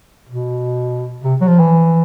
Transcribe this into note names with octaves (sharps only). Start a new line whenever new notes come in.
B2
C3
F#3
F3
E3